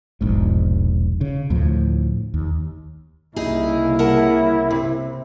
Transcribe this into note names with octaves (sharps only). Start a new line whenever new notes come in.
E1 A#1 G#2
C#3
D2 A2 F3
D#2
C2 C#3 A#3 D#4 E4 G#4
A#4 F#5 A5
C3